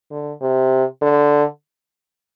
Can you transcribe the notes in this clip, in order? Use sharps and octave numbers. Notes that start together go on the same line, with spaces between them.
D3
C3
D3